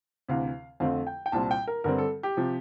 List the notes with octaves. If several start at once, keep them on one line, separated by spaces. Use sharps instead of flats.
D2 C3 E3 F5
F2 D3 F3 A3 C4 F5
G5
G5
C2 A#2 G3 C4 A5
G5
A#4
G2 D3 G3 C4 A#4
A4
G4
C3 F3